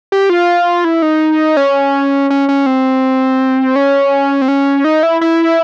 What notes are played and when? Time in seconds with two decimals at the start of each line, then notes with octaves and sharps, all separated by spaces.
0.12 G4
0.30 F4
0.85 E4
1.02 D#4
1.57 C#4
2.30 C#4
2.49 C#4
2.66 C4
3.76 C#4
4.42 C4
4.48 C#4
4.84 D#4
5.03 E4
5.21 E4